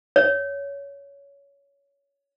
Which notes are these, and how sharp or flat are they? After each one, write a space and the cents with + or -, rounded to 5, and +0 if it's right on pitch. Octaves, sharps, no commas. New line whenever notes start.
C#5 +20